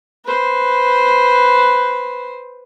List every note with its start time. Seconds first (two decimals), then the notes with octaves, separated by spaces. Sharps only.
0.25 B4 C5